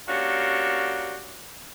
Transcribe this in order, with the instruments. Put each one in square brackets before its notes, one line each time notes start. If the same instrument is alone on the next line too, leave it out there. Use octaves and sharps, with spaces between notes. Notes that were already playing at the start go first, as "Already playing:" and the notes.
[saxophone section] A#3 C#4 D4 F#4 G4